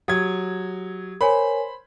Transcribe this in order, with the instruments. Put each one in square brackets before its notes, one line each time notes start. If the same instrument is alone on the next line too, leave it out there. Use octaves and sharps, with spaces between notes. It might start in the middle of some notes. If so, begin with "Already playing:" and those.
[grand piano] F#3 G#6 [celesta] G4 D#6
[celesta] A#4 C#5 G#5 [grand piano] C5 B5